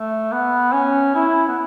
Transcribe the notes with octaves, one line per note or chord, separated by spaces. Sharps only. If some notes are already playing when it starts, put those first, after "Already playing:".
Already playing: A3
B3
C#4
E4
B3